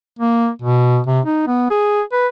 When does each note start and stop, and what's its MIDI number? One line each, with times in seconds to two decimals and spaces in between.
0.19 0.50 58
0.62 0.99 47
1.07 1.20 48
1.25 1.47 63
1.47 1.71 59
1.71 2.02 68
2.12 2.27 71